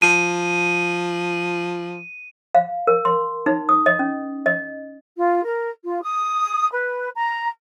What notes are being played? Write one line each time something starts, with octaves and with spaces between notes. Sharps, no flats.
F3 D#7
F5
A#4
C6
D#4
D#6
D#5
C#4
D#5
F4
A#4
F4
D#6
B4
A#5